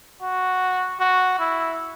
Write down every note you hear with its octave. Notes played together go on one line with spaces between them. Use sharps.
F#4
F#4
E4